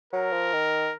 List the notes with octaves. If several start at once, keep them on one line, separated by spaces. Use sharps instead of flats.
F#3 A#4
F3
D#3